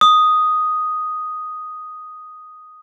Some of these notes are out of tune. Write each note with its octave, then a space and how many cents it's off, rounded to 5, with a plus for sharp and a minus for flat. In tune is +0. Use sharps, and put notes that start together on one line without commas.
D#6 +0